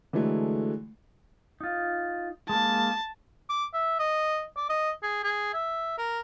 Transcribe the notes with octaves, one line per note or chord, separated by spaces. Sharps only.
D3 E3 F#3 G#3 A3
D#4 F4
G#3 A#3 A5
D6
E5
D#5
D5
D#5
G#4
G#4
E5
A#4